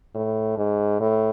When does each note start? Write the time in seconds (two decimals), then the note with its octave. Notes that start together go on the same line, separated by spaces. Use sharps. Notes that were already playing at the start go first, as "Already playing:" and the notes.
0.15 A2
0.58 G#2
1.00 A2